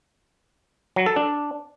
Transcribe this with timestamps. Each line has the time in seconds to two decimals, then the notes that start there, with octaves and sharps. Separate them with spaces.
0.96 F#3
1.06 A4
1.16 D4